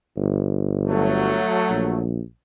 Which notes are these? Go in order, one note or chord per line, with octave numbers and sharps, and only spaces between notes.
G1
F#3 A3
A#1